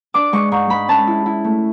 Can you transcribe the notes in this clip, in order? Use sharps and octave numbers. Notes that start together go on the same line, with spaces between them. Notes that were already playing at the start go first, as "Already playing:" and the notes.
D4 D6
G#3 C#6
G#2 C#6
G#3 B5
C#4 A5
E4
E4
A3